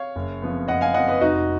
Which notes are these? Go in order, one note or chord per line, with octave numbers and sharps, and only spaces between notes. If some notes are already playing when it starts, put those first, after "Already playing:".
Already playing: C#5 F5
F#1
F2 F3 B3
F#1 D#5 F#5
F5 G#5
F2 F3 B3 D#5 F#5
B4 D#5
F1 D#4 F#4